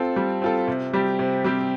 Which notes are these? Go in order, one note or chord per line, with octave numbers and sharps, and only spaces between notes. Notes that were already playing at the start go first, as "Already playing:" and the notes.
Already playing: C4 F4 A4
G3
C4 F4 A4
C3
G3 C4 G4
C3
G3 C4 G4